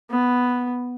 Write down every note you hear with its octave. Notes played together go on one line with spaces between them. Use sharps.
B3